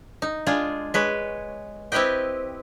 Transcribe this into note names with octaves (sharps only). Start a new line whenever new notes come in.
D#4
G#3 D4 F4 G#4
G#3 B4 C#5
C4 E4 G4 B4 D#5 G5